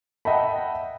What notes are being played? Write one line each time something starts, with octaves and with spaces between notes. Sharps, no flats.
D#5 E5 F#5 G5 A5 B5